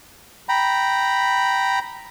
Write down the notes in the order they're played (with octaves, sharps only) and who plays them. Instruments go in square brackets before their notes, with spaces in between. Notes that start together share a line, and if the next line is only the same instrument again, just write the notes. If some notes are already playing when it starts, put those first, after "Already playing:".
[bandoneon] G5 A#5 B5